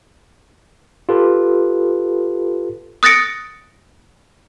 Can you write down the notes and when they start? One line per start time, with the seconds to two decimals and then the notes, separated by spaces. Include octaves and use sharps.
1.09 F4 G4 A4 B4
3.03 D#6 F#6 A6 A#6 C#7 D7